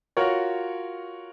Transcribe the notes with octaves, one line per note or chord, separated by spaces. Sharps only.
F4 F#4 A#4 C#5